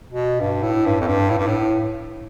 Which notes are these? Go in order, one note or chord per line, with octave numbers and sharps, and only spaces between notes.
B2
G2
A2
G2
F2
G2
A2
G2
A2